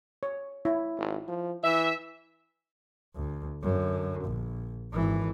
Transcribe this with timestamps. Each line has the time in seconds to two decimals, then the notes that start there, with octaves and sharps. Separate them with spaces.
0.23 C#5
0.65 E4 C#5
0.98 G#1
1.28 F3
1.64 E3 E5
3.15 D2
3.63 F#2 D3
4.25 A#1
4.93 G#1 E3